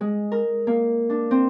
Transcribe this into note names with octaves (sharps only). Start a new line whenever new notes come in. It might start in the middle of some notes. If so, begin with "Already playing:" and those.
G#3
A#4
A#3
D4
C4